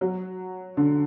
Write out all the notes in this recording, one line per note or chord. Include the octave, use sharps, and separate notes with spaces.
F#3
D3